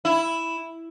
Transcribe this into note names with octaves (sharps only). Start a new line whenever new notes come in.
E4